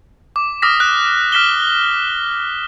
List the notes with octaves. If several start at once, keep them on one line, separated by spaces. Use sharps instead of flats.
D6
D6 D#6 F6 A#6 B6
F#6
F6 B6 E7 G7